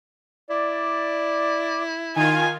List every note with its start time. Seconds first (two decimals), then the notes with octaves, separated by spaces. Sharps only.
0.50 E4 D5
2.16 D#3 F4 G#5